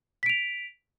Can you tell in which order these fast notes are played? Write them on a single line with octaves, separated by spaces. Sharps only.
B6 D7 F7